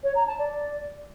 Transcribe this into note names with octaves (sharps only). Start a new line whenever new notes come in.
C#5
A#5
A5
D5